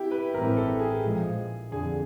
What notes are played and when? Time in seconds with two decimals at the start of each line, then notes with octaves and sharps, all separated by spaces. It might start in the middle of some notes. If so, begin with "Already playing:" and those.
Already playing: E4 G4
0.11 B4
0.34 A1 G2 E3 G#3 C4 A#4
0.57 A4
0.80 G#4
1.03 A#1 A#2 F3 G#3
1.72 F2 D3 G#4